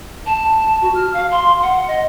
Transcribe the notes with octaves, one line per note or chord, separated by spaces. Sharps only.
A5
F#4
F6
F5
C6
F#5
D#5